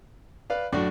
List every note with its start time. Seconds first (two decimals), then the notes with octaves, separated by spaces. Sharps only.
0.50 B4 D5 F5
0.72 F#2 A2 D4 F#4